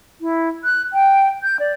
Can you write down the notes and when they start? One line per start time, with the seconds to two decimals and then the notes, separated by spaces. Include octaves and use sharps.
0.21 E4
0.64 F#6
0.93 G5
1.43 G6
1.60 D5